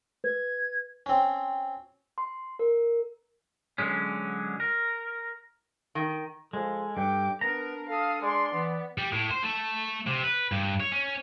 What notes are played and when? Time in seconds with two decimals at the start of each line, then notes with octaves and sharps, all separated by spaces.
0.24 B4 G#6
1.06 C4 C#4
2.18 C6
2.59 A#4
3.78 D3 F#3 G#3 C#4
4.60 A#4
5.95 D#3
6.53 F3 G#3 A4
6.97 G2 G5 D6
7.41 B3 D4 A#4 A#5
7.89 A4 F5 D#6
8.22 G#3 D5 C6
8.53 E3 B3
8.98 G3
9.13 A2
9.31 C5
9.43 A3
10.07 C3
10.23 B4
10.52 G2
10.80 C#5
10.92 C#4